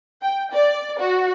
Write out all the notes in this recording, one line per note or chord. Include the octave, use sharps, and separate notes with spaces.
G5
D5
F#4